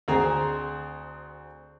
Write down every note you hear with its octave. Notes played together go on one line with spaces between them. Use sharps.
D2 C4 G#4 C5 A#5